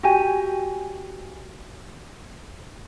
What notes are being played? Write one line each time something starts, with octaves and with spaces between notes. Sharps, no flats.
F#4 G4 G#5